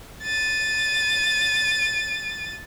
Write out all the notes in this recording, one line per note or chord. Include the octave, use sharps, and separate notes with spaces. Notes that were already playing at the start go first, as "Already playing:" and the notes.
A6 D#7